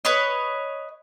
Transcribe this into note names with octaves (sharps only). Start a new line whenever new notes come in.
B4 C#5 D#5